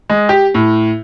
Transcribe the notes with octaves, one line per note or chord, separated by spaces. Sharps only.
G#3
G4
A2